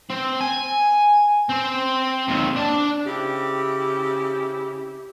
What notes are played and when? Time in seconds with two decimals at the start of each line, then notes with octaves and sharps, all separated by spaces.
0.10 C4
0.41 G#5
1.50 C4 C5
2.28 D#2 C3
2.56 D4 A5
3.06 C#3 C4 E4 G4